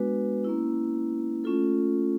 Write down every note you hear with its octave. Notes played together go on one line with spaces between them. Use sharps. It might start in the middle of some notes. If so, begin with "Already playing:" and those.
Already playing: G#3 B3 D4 F#4 B4
A#3 C#4 E4
A3 C#4 F4 A4